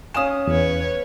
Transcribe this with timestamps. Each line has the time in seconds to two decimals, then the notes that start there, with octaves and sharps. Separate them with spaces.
0.14 C#4 F5 G#5 D#6 E7
0.47 E2 B4 C#5